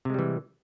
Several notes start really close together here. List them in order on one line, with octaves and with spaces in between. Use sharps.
C3 G#3 G3 E3